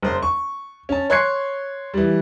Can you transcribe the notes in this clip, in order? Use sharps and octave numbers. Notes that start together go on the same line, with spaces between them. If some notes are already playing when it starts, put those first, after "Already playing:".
F#1 C5 C6
C#6
C#4 A5
C#5 C6 F#6 G#6 C7 C#7
E3 G3